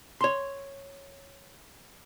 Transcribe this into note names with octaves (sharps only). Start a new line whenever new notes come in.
C#5 C6